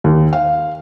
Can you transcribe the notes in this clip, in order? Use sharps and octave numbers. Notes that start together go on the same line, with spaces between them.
D#2
F5